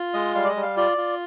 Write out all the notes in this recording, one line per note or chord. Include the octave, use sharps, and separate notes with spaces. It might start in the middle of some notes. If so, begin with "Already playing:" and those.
Already playing: F4
G#3 D#5
G3 F5
D5
D#5
G3
F5
F4 D5
F4